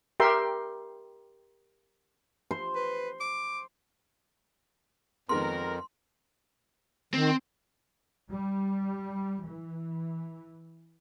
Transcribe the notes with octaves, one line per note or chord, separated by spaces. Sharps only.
G4 A#4 E5 G5 C6
C5
B4
D6
F2 D#3 G#3 B3 A#4 C6
D#3 C4
G3
E3